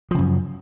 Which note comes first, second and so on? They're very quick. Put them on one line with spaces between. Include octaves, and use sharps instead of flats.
F3 C#3 F#2